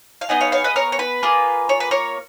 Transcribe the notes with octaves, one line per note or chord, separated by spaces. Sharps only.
F5
B3 D#4 G#4 D#5 F#5
C#5 F5
C#5 F5
B4 D#5
A#4 C#5
C#5
B4
A#3 F4 G#4
C#5
B4
A#4 C#5